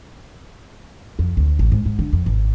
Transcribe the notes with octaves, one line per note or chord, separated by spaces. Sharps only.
F2
D2
A1
G#2
G#2
D3
F2
G#1